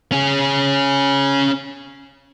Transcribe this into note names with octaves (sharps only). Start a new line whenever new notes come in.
C#4 G#4